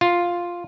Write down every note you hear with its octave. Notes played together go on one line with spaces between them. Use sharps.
F4